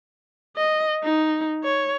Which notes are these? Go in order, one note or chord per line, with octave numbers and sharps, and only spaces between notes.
D#5
D#4
C#5